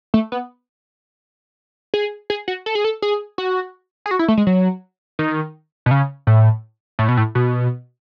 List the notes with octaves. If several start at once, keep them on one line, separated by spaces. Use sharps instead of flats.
A3
B3
G#4
G#4
F#4
A4
G#4
A4
G#4
F#4
G#4
F#4
E4
A3
G#3
F#3
D#3
B2
C#3
A2
A2
B2
A2
B2